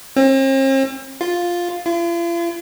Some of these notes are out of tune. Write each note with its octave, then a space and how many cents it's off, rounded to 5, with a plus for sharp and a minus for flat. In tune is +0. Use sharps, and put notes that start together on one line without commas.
C4 +45
F4 +5
F4 -45